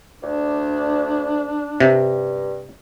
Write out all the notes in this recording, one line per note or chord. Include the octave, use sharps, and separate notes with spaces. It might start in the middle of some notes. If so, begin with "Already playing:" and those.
D2 D4
G2 C3